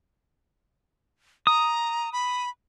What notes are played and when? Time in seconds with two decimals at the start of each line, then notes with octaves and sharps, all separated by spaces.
1.47 A#5 D#6
2.13 B5